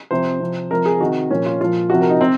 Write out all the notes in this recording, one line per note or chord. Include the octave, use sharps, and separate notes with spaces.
C3 F3 C5
C3 F3
C3 F3 A#4
G#4
C3 D#3 F#4
A#2 F3 C#4
F4
A#2 F3 F4
C3 F3 F#4
A#4
D#4
C3 C4